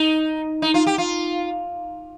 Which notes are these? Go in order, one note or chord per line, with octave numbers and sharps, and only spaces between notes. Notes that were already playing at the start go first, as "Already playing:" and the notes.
Already playing: D#4
D#4
F4
G4
F4